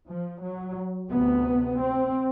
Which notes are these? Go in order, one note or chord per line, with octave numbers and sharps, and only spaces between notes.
F3
F#3
D2 C3 B3
C4